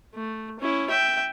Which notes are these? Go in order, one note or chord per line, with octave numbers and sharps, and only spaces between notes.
A3
C#4 E4
E5 G5